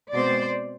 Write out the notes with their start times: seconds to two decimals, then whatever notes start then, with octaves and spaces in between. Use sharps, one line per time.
0.13 B2 G#3 C4 C5 D5